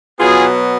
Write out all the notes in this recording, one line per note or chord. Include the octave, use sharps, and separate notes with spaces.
B2 F#3 B3 F4 G#4